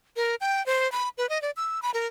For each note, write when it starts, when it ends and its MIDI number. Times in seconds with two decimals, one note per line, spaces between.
0.16 0.35 70
0.41 0.65 79
0.66 0.90 72
0.92 1.09 83
1.18 1.29 71
1.29 1.41 75
1.42 1.51 74
1.57 1.80 88
1.82 1.91 83
1.94 2.07 70